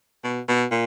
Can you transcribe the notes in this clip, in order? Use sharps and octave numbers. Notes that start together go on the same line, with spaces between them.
B2
B2
A#2